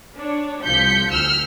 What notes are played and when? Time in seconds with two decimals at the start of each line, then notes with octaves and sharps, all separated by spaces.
0.17 D4 C#5
0.63 C2 F3 G6 B6 C#7
1.10 D2 E6 F6